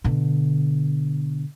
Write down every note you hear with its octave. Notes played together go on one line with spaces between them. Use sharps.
B2 D3